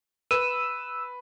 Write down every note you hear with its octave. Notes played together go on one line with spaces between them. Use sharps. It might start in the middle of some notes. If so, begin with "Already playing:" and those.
B4 E6 D#7